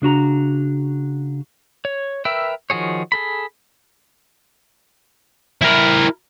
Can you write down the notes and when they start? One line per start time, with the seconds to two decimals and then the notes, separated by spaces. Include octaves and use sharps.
0.02 C#3 D4 F#4 A#5
1.85 C#5
2.25 A#4 B4 E5 G5 E6
2.70 D#3 F3 F#4 G#4 C#5
3.12 G#4 A4 B5
5.62 E4 A#4